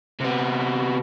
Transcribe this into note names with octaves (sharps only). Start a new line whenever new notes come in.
C3 B3